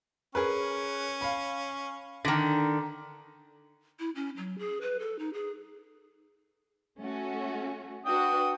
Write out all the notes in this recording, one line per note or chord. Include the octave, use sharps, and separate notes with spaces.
C#4 G#4 A#4 B4
F5 B5
D3 D#3 A#6 B6
E4
C#4
F#3
G#4
B4
A4
D#4
G#4
A3 C#4 F#4
D4 F#4 B4 G5 D#6